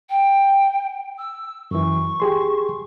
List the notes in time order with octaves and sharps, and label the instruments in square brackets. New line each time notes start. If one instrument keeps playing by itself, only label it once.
[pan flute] G5
E6
[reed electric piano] F#2 E3 [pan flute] C#6
[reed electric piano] G4 G#4 C6